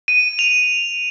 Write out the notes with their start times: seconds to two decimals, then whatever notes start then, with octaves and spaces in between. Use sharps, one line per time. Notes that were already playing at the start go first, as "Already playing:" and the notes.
0.08 D#7
0.39 F7